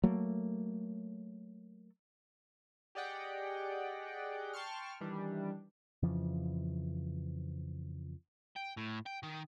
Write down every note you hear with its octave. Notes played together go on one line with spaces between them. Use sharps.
F#3 A3 A#3
G4 G#4 D5 D#5 F#5 G5
G5 A5 C6 C#6 F6
D#3 E3 G3 D4
F2 C#3 E3 F3
G5
A2
G5
D#3